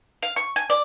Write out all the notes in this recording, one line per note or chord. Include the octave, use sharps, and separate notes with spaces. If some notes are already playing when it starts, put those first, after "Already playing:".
F5
C#6
G#5
D5